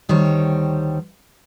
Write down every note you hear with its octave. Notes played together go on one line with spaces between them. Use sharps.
D2 D#3 G3 C5 C#5